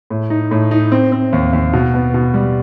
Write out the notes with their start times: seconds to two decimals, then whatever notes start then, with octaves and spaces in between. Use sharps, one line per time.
0.10 A2
0.30 D#4
0.51 A2
0.71 D#4
0.92 C4
1.12 C4
1.32 D#2
1.53 D#2
1.73 B2
1.94 B3
2.14 B2
2.34 G3